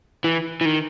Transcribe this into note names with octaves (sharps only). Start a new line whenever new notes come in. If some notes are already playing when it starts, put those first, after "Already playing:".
E3
E3
D#3